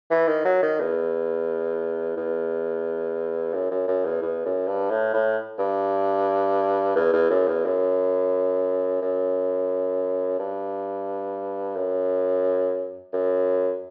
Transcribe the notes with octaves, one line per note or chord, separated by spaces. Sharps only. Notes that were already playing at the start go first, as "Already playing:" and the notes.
E3
D#3
F#3
D#3
E2
E2
F#2
F#2
F#2
E2
E2
F#2
G2
A2
A2
G2
E2
E2
F#2
E2
F#2
F#2
G2
F#2
F#2